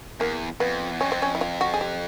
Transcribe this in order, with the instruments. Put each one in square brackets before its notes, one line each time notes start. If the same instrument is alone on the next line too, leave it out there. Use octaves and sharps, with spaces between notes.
[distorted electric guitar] E2 [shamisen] A#3
[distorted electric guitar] F2 [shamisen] B3
[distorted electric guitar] E2
[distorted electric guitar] F2 [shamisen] C#4
[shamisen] C4
C#4
E4
F4
F#4
G#4
G4